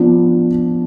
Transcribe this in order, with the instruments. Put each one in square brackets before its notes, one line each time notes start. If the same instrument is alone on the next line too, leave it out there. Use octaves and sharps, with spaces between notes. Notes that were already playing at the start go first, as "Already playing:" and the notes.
Already playing: [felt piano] F3 B3 D4